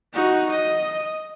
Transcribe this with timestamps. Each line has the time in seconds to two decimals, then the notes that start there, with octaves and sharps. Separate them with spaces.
0.13 D#4 F#4
0.50 D#5